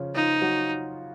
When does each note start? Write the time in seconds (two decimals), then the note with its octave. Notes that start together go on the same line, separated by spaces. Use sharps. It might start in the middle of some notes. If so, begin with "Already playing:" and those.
Already playing: C#3 F3 C#4 F4
0.15 F3 D#4 F4
0.41 F#3 F#4